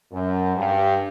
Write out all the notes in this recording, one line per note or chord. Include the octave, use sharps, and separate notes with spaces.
F#2
G2